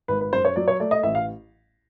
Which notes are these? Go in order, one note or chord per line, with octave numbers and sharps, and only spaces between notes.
G#1 B4
B4
F#2 C5
C#5
F#3 D5
C#5
A3 D5
D#5
A1 E5
F5